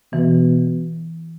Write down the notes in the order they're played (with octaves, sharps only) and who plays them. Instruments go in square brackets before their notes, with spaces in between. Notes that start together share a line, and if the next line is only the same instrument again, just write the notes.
[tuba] B2 [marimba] E3